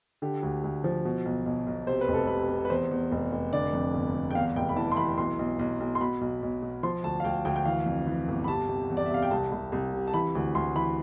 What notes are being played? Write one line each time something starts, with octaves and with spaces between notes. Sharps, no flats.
D3 G4
D2
D2
F3
B2
B1
B1
B1
C3 C5
B4
F1
A4
C3 B4
C3
B4
E2 C5
E2
F1
F1
D3 D5
F2
G1
G1
G5
E2 F5
F1 G5
B5
E3 A5
C6
E3 B5
B1 C6
B1
B1
B1
C6
B2 B5
B1
B1
B2
F3 C6
D2 A5
F5
D2 G5
D2 G5
G5
E3 F5
F2
E3
G1
B5
C3 A5
C3
E2
D5
E5
C3 F5
G5
C2 A5
C2
C2
C3
A5
E3 B5
D2
D2 C6
E3 B5